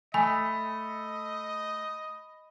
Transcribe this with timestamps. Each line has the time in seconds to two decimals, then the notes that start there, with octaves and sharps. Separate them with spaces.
0.14 A3 D#5 G#5 B5